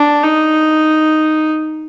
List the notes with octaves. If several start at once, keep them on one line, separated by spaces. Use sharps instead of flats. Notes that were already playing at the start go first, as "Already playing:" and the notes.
Already playing: D4
D#4